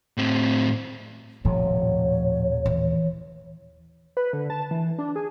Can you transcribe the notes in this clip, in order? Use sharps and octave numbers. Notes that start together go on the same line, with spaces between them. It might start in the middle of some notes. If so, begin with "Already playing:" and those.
A2 C4
D#1 A2 C3 F3 C#5
E3
B4
D3
A5
E3
D4
G#4